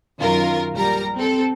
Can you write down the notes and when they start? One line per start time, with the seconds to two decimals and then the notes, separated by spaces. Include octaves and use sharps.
0.19 F#2 D#3 F4 A#4
0.74 A#1 G3 A#4 A#5
1.15 C4 A4